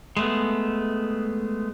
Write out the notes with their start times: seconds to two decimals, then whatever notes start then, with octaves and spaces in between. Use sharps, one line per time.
0.17 G#3 A3 B3